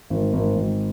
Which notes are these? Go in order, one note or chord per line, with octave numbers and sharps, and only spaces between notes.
G#1
G#1
G#1